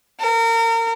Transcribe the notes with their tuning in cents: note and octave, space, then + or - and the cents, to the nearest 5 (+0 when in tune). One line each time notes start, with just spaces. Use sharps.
A#4 -30